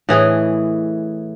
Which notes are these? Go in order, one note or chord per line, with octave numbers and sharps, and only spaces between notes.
A2 E3 G#4 D#5